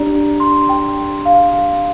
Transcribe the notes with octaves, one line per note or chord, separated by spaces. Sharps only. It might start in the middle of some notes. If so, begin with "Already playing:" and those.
Already playing: D4 G4 D5 A#5
C6
G5
F5